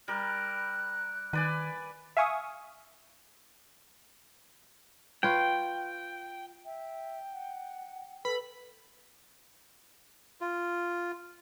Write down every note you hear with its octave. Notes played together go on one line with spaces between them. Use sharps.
G3 A#4 F#6
D#3 B4 D5 G#5
E5 F5 G#5 C#6 D#6
F4 B4 C#5 G5
E5 G5
F#5
A4 B4 B5
F4